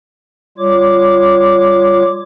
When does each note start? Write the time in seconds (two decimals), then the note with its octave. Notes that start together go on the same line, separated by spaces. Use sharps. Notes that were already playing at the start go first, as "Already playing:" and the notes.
0.58 G3 F4 C#5 D6